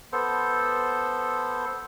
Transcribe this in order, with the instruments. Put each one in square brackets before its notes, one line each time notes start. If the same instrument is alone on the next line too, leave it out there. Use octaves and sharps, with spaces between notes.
[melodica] B3 A4 C5